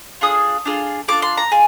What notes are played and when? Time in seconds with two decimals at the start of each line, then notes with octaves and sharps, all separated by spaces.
0.21 D4 F4 G#4 D#6
0.66 D4 F4 G#4
1.08 D4 F4 G#4 D6
1.22 C6
1.37 A#5
1.51 F4 G#4 G#5